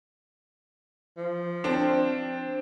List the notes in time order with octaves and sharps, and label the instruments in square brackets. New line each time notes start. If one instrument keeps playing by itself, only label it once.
[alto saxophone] F3
[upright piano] C4 D4